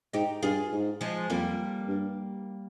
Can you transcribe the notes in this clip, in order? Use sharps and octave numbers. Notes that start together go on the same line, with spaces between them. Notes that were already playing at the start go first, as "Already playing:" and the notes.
G#2 D#4 G4
G2 F4 G#4
G#2
F3 G#3
F2 G3 A#3
G2